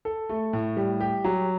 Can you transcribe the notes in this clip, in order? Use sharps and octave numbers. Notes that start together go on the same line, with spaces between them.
A4
A3
A2
G3
G4
F#3